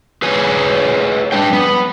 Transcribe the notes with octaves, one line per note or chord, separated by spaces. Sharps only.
G#4 B4 C#5 G#5
G3 G#3 D4 B4 G5
B3